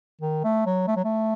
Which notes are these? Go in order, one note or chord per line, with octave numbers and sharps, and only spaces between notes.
D#3
A3
F#3
A3
F#3
A3